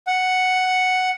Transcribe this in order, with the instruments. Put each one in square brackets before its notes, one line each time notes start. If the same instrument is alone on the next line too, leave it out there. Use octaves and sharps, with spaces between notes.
[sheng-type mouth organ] F#5